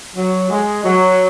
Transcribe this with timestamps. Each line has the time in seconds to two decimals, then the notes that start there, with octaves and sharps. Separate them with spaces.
0.16 F#3
0.50 G#3
0.84 F#3